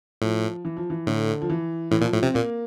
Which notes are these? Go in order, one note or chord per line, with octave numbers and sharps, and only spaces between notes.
A2 F3
E3
F3
E3
A2 D3
F3
E3
A2 E3
A#2 F3
A2 F3
C3 C4
A#2 A#3